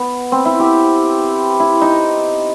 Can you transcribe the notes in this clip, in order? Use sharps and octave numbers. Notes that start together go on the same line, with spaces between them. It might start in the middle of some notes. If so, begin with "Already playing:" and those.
Already playing: B3
C4
E4
G4
E4
D#4